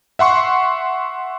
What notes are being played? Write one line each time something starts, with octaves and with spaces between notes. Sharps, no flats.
E5 F#5 C6 C#6